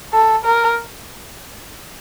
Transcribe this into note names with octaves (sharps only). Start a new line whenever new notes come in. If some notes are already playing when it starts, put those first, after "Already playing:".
A4
A#4